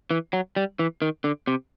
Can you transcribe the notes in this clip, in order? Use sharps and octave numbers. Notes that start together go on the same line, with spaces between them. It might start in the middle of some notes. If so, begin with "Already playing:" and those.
E3
F#3
G3
E3
D#3
D3
C3